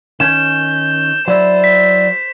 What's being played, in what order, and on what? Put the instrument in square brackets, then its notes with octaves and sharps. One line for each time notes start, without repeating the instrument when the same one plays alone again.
[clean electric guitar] D#3 C#4 [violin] G6 [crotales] E7
[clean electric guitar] F#3 E4 [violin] C5 [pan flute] D5
[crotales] B6